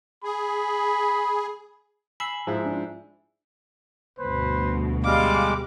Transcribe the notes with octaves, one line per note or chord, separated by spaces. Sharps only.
G#4 B5
G#5 B5 E6 C7
G#2 F3 E4
D4 F4
D2 G2 B2 B4 C5 B5
G3 G#3 F5 D6